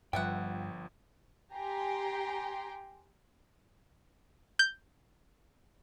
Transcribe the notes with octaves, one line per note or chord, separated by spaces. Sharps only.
G1 G2 F3 G3 B3 E5 F#5 G5
G4 G5 G#5 A#5 C6
G6